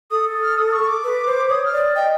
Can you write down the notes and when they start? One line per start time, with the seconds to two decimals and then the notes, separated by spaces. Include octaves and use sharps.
0.11 A4 D#6
0.42 F6
0.57 D#6
0.73 C#6
0.88 D6
1.04 B4
1.26 C5
1.49 C#5 D#6
1.65 F6
1.72 D5
1.96 D#5 G5